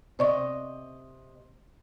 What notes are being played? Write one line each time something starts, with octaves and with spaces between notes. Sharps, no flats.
C3 C5 D5 D#5 C#6